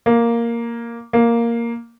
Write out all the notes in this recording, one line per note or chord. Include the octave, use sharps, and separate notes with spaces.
A#3
A#3